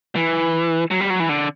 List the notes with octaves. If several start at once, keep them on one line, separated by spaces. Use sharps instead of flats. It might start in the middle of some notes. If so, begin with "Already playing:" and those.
E3
F#3
G3
F#3
E3
D3